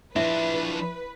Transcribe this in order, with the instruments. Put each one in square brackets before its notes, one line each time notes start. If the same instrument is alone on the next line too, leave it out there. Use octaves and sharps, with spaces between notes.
[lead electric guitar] F3 D4 [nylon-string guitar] E4 [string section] B4 [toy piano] E5